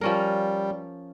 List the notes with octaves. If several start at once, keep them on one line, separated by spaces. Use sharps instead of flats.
F3 G3 C#4 A#4